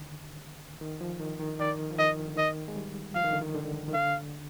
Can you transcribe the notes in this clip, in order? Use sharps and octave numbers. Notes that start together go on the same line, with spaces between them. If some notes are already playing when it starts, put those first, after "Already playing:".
Already playing: D3 D#3
D#3
F3
D#3
D#3
D#3 D5
F3
D#3 D#5
D3
D#3 D#5
G#3
G3
F3 F5
D#3
D3
D#3
D3
D#3
D3 F5